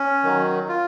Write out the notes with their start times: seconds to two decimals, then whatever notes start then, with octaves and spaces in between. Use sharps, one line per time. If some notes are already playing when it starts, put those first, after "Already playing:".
Already playing: C#4
0.24 D#3 F#3
0.69 F4